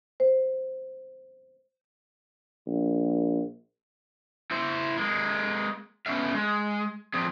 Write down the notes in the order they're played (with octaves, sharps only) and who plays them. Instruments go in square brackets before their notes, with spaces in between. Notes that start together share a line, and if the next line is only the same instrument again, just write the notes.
[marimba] C5
[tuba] A#1
[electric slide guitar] E4 C5
G#3 A#3
B3 C#4 E5 F5
G#3
A#2 F3 C4 G#4